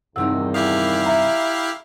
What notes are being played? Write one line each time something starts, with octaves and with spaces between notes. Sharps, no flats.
E2 G2 C3 D#3 D#4 F#5 E6
E4 G4 F5 D#6
E5 A#5